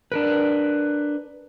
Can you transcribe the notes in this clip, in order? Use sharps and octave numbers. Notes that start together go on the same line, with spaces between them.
D4 A#4 B4